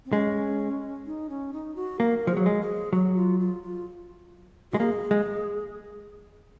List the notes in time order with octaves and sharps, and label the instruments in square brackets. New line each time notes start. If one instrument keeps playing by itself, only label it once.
[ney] C4
[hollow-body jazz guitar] G#3 [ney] C#4
[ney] D#4
C#4
D#4
F#4
[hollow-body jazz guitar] A#3 [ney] A#4
[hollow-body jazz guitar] F3 [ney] G#4
[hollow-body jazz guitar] F#3
G#3
[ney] G#4
[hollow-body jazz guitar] F#3 [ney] F#4
[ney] F4
F4
F4
[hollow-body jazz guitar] G#3 [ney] F#4
[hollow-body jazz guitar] A#3 [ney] G#4
[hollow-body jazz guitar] G#3